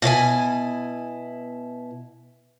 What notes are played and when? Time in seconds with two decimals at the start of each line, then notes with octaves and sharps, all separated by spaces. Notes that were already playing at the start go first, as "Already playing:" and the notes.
0.02 B2 E4 C5 G#5